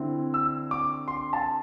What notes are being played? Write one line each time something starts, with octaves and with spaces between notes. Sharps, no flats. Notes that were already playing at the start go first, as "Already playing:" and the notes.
Already playing: D3 C4 E4
E6
D6
C6
A5